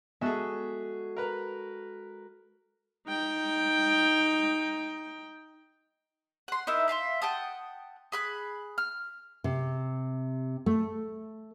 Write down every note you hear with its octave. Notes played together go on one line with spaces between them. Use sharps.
G#3 B3 F#4 G#4 A4 E5
A#4 B4 A#5
D#4 G5
F#5 C6
D#4 E4 A#4 E5
E5 F5 G#5 C6
F#5 G5 A5 D#6
G#4 B5 F#6
F6
C3
A3